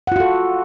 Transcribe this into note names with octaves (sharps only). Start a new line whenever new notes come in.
F4 F#4 A4 F#5